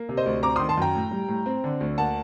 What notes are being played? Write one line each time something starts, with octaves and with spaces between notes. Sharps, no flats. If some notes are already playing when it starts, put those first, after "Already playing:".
Already playing: A#3
C3
C5 D#5
D2
C4 A#5 D6
D#3 C6 D#6
A5 C6
F#2 G5 A#5
A2
G3
A2
C4
D3
D2
A#3 F#5 A5